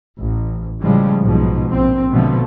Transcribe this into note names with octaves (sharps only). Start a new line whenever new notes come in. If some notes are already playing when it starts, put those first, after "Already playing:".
A1
A2 C#3 F3 G3 G#3
B1 G#2 B2 F3
A#1 C4
B2 D3 F3 A3